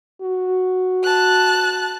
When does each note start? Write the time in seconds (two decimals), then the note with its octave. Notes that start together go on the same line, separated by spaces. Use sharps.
0.22 F#4
1.03 A5 F#6